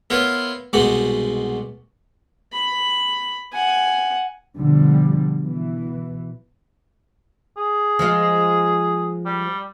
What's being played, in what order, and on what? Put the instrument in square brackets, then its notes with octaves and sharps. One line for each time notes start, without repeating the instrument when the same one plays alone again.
[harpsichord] B3 E4 F4 A#4 C5 C#5
C2 G#2 B2 D#4 F#4 F#5
[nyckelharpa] B5
F#5 G#5
[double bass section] B2 D3 F3 G3
B2 E3
[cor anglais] G#4
[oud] F3 G#3 F4
[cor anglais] G3